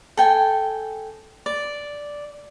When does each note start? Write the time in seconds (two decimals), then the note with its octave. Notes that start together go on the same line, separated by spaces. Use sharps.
0.17 A4 G5 G#5
1.46 D5